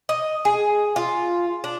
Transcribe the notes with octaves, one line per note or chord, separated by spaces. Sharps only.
D#5
G#4
F4
D4